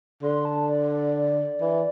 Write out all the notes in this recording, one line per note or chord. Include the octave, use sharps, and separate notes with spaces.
D3 C6
A5
D5
D5
E3